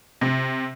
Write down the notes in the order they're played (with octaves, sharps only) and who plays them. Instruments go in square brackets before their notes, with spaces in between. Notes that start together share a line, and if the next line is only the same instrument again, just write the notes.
[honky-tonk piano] C3